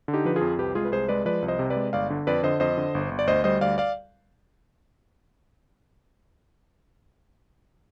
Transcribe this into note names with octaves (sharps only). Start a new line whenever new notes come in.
D3
D#4 G4
F3 B4
F4 G#4
F2
C2 G4 B4
G#3 F4 G#4
B4
C2 G#4 C5
G#3 B4 D5
F3 B4 D5
C2
C5 D#5
C3
B4 D5
G#3
G1 D5 F5
D3
F2 B4 D5
D3 C5 D#5
F2 C5 D#5
D3
G1
G1
D5
D2 C5 D#5
G3 C5 D#5
D2 D5 F5
D5 F5